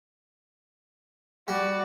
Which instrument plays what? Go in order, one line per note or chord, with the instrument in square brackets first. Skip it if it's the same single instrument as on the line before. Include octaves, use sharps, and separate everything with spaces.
[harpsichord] G3 [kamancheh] F#4 D5